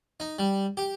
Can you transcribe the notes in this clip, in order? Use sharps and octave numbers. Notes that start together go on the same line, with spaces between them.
D#4
G3
G4